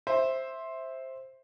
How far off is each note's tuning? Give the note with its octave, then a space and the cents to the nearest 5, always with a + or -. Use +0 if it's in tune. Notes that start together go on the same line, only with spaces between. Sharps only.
C5 +10 E5 -5